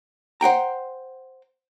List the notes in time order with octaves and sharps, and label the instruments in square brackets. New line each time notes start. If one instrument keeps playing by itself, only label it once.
[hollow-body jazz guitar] C5 F#5 G5 A#5